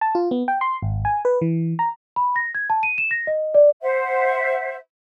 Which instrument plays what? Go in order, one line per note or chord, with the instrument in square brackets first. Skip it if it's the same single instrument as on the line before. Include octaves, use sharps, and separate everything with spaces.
[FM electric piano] A5
F4
B3
G5
C6
G#1
G#5
B4
E3
A#5
[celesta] B5
A#6
G#6
A5
D#7
E7
A#6
D#5
D5
[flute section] C5 E5 F#5